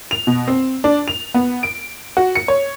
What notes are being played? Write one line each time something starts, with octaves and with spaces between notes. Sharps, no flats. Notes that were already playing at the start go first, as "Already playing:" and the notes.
F7
B2
C4
D4
F7
B3
D7
F#4
C#7
C#5